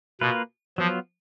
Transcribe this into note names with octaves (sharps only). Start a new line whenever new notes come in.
B2 A#3 F4 B4
F3 F#3 B3 F4